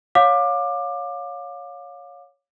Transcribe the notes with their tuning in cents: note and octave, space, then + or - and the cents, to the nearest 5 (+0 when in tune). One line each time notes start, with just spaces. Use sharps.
C#5 +5 F5 +25 D6 +20